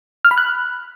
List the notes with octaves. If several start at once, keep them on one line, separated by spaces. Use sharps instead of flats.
F6
B5
F#6